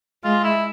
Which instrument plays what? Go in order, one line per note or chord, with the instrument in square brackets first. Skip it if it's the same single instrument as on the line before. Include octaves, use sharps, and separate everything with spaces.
[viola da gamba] G#3 [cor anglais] F4
[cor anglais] E4